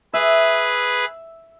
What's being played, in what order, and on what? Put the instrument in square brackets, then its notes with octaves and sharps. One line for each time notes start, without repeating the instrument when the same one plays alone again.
[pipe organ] G#4 B4 [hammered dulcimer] E5